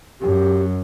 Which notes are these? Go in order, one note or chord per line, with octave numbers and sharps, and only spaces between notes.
F#2 G4